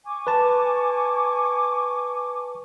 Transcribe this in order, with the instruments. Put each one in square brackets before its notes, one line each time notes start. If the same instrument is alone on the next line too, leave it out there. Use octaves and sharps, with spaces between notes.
[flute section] G#5 C#6 D6
[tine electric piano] B4 A5